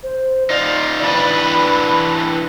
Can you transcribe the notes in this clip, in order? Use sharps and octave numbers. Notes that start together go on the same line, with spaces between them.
C5
D#4 F4 D5
E3 D4 B4 B5